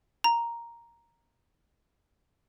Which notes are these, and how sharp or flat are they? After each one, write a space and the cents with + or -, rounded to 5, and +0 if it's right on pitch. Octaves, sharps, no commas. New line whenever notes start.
A#5 +0